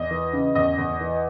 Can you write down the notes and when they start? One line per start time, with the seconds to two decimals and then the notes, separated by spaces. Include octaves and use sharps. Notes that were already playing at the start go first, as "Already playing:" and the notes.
Already playing: E2 D#5
0.11 E3
0.33 C#3
0.55 E2 D#5
0.78 E2
1.00 E3